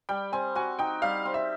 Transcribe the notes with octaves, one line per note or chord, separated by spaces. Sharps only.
G3 G5
C4 G#5
F#4 G#5
D#4 G5
G3 F5
C4
E5